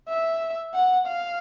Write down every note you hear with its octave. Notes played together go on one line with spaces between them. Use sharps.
E5
F#5
F5